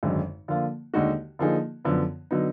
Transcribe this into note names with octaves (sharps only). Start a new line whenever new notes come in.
G#1 F#2 D3 G#3
D3 F3 A#3 F4
D#2 D3 G#3 D#4 F#4
D3 F3 A#3 D#4 G#4
F#2 D3 F3 B3
D3 F#3 B3 D#4